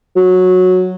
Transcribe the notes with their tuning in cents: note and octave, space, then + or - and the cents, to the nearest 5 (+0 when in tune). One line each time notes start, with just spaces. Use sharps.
F#3 -10